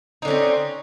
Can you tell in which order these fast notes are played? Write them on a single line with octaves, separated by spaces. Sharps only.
D#4 D3 C#4 C4